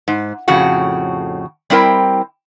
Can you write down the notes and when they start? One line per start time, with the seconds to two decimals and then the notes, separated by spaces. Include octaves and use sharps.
0.08 G#2
0.48 F2 A2 C#3 F#4
1.70 G3 C4 E4 A#4 G5